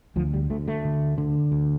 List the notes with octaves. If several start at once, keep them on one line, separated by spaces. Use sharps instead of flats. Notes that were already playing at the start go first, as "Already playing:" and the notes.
D2 F3
G3
D2 A3
A3
D3
D3
D2